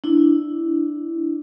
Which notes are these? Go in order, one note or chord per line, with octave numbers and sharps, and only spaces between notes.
D4 E4